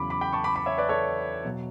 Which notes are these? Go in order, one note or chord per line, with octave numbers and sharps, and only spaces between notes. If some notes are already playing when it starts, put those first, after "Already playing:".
Already playing: E2 C#3 F#3 B5 D6
B5 D6
G5 B5
A5 C#6
B5 D6
B5 D6
C#5 E5
B4 D5
A4 C#5
B2 F#3